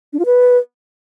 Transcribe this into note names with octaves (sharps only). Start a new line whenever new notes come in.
D4
F4
B4